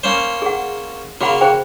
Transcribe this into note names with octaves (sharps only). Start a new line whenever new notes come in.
A#3 C#4 C5
G#4 F#5
C#3 A#3 F#4 F#5 B5
G#4 C5 G5